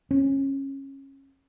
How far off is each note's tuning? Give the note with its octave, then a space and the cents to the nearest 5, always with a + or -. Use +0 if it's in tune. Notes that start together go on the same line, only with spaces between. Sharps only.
C#4 -25